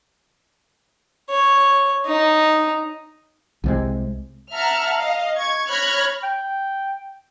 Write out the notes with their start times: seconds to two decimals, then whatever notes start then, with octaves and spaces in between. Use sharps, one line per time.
1.30 C#5
2.06 D#4
3.64 C2 C3 G#3
4.53 E5 F#5 A5 A#5 F6
4.95 D#5 F5
5.36 C#6 G#6
5.69 C#5 B5 F6 F#6 G#6 A#6
6.23 G5